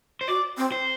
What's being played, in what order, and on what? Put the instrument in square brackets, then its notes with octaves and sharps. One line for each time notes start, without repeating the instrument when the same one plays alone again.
[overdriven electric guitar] C5
[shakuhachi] F#4 [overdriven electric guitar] D5
[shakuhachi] C4
[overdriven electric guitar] C5